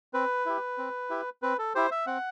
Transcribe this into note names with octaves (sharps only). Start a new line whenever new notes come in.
C4 B4
E4 G4
C4
E4 G4
C4 B4
A4
E4 G4 C5
E5
C4 F#5